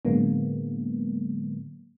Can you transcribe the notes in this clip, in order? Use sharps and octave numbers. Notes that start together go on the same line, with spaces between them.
A2 D3 F#3 G#3 A#3 B3